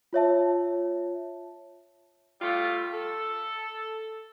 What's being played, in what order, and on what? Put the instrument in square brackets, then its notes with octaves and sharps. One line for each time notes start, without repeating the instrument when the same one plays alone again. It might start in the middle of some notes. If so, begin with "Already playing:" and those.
[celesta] F4 C#5 E5 A5
[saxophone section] G3 A3 F4
A4